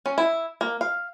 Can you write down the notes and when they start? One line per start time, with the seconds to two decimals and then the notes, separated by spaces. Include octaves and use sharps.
0.06 C#4
0.18 E4
0.61 A#3
0.81 F5